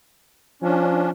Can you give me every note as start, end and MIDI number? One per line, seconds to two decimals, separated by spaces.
0.62 1.11 53
0.62 1.10 61
0.62 1.10 62